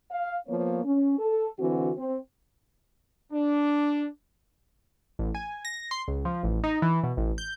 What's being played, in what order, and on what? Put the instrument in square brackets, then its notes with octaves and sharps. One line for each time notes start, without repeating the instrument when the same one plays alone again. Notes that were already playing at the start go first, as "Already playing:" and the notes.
[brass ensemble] F5
F3 A#3 B3 C#5
C#4
A4
D3 E3 C4 F#4
C4
D4
[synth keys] A1
G#5
A#6
C6
C#2
F3
A1
D#4
E3
B2
A1
G6